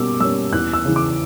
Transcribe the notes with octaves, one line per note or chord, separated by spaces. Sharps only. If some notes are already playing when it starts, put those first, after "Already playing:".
Already playing: B2 G3 A#3 C#4 D6 E6
G3 A#3 C#4 E6
E2 F#6
E6
C#3 E3
D6